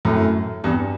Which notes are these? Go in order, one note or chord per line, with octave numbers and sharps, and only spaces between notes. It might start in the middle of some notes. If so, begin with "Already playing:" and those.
F#2 A2
E2 G2